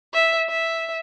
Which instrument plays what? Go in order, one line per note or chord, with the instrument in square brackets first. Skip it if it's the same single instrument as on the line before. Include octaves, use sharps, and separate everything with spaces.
[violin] E5
E5